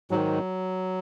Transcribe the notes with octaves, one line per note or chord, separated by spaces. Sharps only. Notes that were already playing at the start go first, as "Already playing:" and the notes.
G#2 D#3 F#3